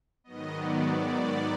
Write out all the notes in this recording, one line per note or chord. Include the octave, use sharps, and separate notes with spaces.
G#2 D#3 F#3 B3 D#5
D5
D5